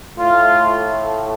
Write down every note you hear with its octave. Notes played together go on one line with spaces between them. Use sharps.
A2 A3 F4